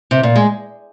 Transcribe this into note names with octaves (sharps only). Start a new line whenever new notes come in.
C3
A#2
G#3